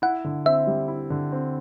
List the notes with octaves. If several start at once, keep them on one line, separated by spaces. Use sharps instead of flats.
E4 F#5
D3
C4 E5
G3
E4
D3
C4